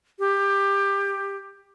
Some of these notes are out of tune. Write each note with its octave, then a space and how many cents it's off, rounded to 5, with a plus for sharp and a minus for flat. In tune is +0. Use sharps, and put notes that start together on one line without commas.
G4 +20